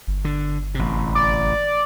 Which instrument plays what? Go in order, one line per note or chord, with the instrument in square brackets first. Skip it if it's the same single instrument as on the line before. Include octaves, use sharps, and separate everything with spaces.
[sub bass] G1
[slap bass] D3
A1 C3
[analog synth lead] D5